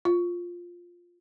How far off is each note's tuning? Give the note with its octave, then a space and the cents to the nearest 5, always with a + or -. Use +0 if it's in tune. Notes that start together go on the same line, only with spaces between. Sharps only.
F4 +5